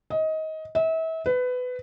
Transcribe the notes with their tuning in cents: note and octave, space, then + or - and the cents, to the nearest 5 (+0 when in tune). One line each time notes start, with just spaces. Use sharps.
D#5 +20
E5 -35
B4 +20